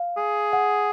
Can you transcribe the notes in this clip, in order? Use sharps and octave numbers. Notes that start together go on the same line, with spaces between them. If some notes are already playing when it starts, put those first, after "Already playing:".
Already playing: F5
G#4
F#5